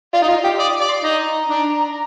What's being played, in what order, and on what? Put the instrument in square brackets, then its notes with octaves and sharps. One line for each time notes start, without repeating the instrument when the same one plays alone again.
[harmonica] F4 [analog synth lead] D5
[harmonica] D#4
[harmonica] F4 [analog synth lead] D#5
[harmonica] G4 [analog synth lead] F5
[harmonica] D5 [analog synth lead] D#6
[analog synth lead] D6
[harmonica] D5
[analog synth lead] C6
[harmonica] D#4 [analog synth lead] A#5
[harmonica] D4